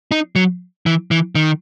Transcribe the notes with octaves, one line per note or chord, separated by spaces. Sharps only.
D#4
F#3
E3
E3
D#3